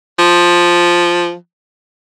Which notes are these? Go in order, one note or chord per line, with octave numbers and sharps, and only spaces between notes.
F3